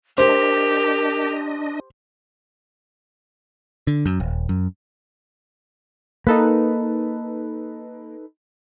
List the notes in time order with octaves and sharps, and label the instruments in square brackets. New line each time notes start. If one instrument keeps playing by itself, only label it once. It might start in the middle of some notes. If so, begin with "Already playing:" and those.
[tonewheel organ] D4 D#5 [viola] G4 [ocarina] A#4 [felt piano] C5
[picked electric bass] D3
F#2
D#1
F#2
[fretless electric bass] A#3 [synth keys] D#4 A4 B4